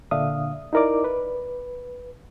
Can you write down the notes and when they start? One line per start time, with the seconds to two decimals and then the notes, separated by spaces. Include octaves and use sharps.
0.11 A#2 D3 D4 E5 F5 D#6
0.73 D#4 E4 A#4 D5 D6
1.04 B4